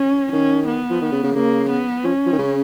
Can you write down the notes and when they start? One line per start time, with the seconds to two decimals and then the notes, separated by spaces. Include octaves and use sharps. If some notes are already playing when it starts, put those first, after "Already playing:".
Already playing: C#4
0.32 D#3 C#4
0.67 B3
0.90 F3
1.02 D#3
1.12 C#3
1.23 C#3
1.35 C#3 A#3
1.70 B3
2.04 F3 C#4
2.26 F3
2.32 D#3
2.38 C#3